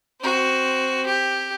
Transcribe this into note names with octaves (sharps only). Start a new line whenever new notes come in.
C4 F#4
G4